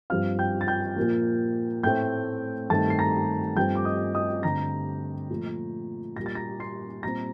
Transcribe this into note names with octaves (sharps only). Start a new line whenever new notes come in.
G2 F3 C4 F5 F6
G5 G6
A6
G5 G6
A#2 F3 A#3
A2 A3 C4 G5 G6
G2 D#3 A3 C4 A5 A6
C7
A#5 A#6
G2 F3 A3 C4 G5 G6
D6
D#5 D#6
D#5 D#6
G2 D3 A3 C4 A#5 A#6
A#2 F3 A3
A#2 G3 A#3 A#6
A6
A#5 A#6
C6 C7
A#2 G3 C4 A#5 A#6